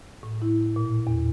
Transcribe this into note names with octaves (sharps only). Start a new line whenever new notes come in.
A2
E4
A#2
E2